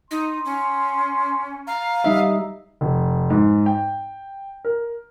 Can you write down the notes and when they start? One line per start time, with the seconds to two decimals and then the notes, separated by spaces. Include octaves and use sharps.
0.11 D#4 C6
0.45 C#4
1.67 F5 A#5
2.04 G3 D#4 D#5 E5
2.81 F1
3.30 G#2
3.66 G5
4.65 A#4